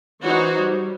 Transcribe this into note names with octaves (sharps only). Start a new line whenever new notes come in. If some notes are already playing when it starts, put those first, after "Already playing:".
E3 D#4 F#4 C5 C#5
G3